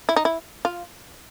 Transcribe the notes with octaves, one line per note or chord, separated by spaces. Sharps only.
E4
D#4
E4
F4